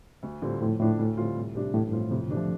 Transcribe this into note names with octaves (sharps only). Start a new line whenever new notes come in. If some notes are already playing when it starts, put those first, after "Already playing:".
D2
A2 D3 G3 C4 F4
F2 A2
A2 F3 D4
D2
D3 G3 C4 F4
C2
C3 G3 D4
A1 A2
G2
A2 F3 C4 F4
F2 C3
D3
C3 A3 D4
F3